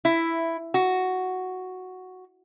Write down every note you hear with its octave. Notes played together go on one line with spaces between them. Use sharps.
E4
F#4